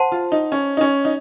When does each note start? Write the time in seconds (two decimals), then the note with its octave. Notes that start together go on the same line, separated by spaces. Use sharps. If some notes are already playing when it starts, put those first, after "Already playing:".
Already playing: C5 F#5 A5 C6
0.12 F4
0.32 D#4
0.52 C#4
0.77 D#4
0.81 C#4
1.05 D#4